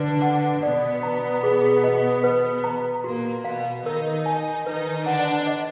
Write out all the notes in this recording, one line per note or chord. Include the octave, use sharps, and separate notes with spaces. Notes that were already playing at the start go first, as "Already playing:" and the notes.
Already playing: D3 D4 B4
F#5
B2 B3 D5
A#5
G#4
D#5
B4
A#5
A#2 A#3 F#4
B2 B3 F5
D#3 D#4 A#4
G#5
D#3 D#4 B4
D3 D4 F#5
D#5